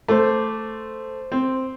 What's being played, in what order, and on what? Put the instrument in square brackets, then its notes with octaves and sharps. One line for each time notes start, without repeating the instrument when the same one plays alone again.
[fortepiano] A3 [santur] C5 D6
[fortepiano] C4